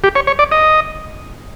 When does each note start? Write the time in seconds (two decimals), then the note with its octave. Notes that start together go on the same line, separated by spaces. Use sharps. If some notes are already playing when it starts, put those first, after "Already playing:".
0.04 G4
0.15 C#5
0.27 C#5
0.39 D5
0.52 D#5